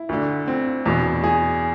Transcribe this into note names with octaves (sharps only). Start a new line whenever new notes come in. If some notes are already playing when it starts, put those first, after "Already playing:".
Already playing: E4
D2 D3
C4
E2 B2
G#4